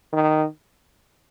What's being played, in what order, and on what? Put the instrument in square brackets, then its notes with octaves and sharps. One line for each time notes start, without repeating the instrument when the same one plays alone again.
[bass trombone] D#3